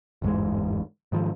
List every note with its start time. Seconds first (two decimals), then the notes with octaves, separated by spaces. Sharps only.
0.22 G1 E2 G#2 G#3
1.12 G#2 D#3 F3